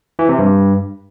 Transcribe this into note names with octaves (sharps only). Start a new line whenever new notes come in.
E3
C3
G2